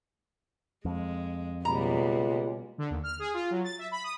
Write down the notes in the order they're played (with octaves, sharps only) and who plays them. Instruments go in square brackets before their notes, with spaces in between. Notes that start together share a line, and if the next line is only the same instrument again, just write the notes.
[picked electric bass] F2 [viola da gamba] G#3
[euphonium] C#2 [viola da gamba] B2 G3 A#3 [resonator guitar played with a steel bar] A#5
[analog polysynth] D3
D#2
F6
G#4
F4
F#3
A6
E5
B5
D#6